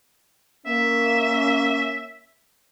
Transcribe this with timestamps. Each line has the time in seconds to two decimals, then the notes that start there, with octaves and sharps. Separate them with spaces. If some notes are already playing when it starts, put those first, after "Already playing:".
0.66 A#3 C#4 E5